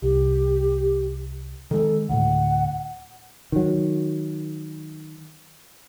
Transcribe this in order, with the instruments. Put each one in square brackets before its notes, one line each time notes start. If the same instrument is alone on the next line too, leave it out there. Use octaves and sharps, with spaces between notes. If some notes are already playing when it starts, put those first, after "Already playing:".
[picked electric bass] C2 [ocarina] G4
[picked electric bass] D#3 G#3 [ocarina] A4
[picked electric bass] D2 A2 [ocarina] F#5
[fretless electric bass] D#3 F#3